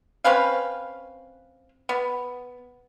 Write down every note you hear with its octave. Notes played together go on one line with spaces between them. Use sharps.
C4 C#4 B4 F5
B3